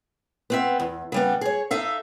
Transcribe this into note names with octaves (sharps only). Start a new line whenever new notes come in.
B3 C4 E5
E2
C#3 G3 B3
G#4 C#5
D#4 A4 E5 F5